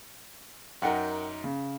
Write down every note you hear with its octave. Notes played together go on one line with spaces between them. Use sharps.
F#2 D#4 A#4 F#5 G5
C#3